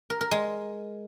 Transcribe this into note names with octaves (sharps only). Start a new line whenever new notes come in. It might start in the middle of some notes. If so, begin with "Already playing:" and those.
A#4
A#4
G#3